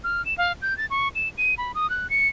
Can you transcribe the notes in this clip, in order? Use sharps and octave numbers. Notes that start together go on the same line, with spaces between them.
F6
E7
F5
G6
A6
C#6
E7
D#7
B5
D#6
F#6
C#7